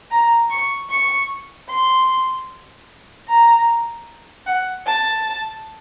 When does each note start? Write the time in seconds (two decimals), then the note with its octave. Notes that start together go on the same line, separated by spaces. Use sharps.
0.10 A#5
0.50 C#6
0.90 C#6
1.69 C6
3.28 A#5
4.46 F#5
4.86 A5